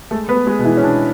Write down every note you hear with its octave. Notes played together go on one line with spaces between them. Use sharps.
G#3 A3 A4
B3 B4
G#3
G#3 G#4
B2
E3 E4
C#4
B2 D4